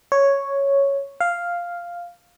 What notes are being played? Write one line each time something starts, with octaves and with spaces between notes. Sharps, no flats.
C#5
F5